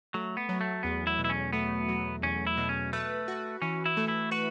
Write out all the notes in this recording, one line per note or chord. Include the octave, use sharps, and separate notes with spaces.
F#3 A3
B3
F#3
A3
E2 B3
E4
B2
E4
C#4
A3 B3
F#3
E2 C#4
E4
B2
C#4
A3 B4
F#4
E3 C#4
E4
A3
E4
F#4 B4